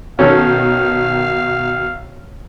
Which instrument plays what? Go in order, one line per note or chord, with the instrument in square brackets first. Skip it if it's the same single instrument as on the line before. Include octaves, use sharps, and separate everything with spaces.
[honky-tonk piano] B2 D#3 [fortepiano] C#4 A4 C#5 [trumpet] F5